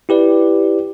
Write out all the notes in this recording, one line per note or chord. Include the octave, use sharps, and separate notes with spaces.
E4 G4 B4 D5